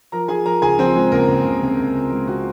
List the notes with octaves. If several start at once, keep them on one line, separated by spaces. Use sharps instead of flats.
F3 A#4 A#5
F3 G#4 G#5
F3 A#4 A#5
C#2 G#4 G#5
F3 C4 C5
G#3
C#2 A#3 A#4
C#2
C#2
C3
C#2
C#2
G#3
C3 F#4